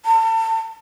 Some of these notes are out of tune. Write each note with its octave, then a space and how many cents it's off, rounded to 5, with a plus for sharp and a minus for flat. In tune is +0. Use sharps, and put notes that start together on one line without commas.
A5 +35